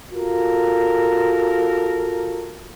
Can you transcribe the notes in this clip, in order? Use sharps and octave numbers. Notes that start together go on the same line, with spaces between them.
F4 F#4 A4 A#4